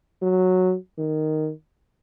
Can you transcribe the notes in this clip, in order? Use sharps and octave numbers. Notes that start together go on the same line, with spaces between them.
F#3
D#3